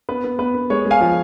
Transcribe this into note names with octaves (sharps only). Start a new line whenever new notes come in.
B3 B4
B3
B3 B4
B3
G#3 C#5
G#3
F5 G#5
F3